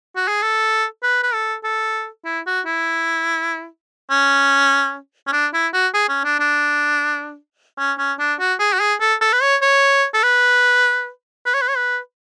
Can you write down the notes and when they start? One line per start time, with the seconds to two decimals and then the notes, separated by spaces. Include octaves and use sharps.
0.16 F#4
0.28 G#4
0.42 A4
1.03 B4
1.23 B4
1.34 A4
1.64 A4
2.25 E4
2.47 F#4
2.66 E4
4.11 C#4
5.27 C#4
5.33 D4
5.54 E4
5.74 F#4
5.94 G#4
6.09 C#4
6.25 D4
6.40 D4
7.79 C#4
7.99 C#4
8.20 D4
8.40 F#4
8.60 G#4
8.74 F#4
8.80 G#4
9.01 A4
9.21 A4
9.33 B4
9.42 C#5
9.62 C#5
10.14 A4
10.23 B4
11.46 B4
11.54 C#5
11.62 B4
11.69 C#5
11.77 B4